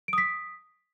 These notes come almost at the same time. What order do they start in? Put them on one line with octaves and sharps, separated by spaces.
D7 D#6 B6